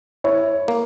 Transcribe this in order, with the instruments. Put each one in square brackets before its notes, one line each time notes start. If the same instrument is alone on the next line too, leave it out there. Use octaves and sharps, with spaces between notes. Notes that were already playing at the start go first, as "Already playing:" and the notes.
[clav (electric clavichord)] E4 [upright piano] C#5
[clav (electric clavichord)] A#3